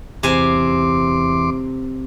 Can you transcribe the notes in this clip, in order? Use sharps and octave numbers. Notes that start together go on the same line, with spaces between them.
E2 C3 G#5 C6 D6